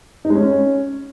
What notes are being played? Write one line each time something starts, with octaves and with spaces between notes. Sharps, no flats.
D#4
G#3
C#4